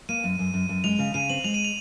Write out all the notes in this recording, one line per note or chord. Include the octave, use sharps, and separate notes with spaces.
A#3 D#7
F#2
F#2
F#2
F#2
G#3 F7
C#3
C#3 D#7
C4 F#7
G#3 F7
D#7
F7